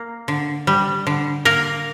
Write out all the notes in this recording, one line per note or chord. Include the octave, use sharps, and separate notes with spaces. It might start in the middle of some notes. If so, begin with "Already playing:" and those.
Already playing: A#3
D3
G3
D3
A#3 A#4